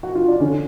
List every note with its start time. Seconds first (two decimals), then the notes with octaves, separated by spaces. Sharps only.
0.03 F#4
0.15 F4
0.28 D4
0.40 D3 C#4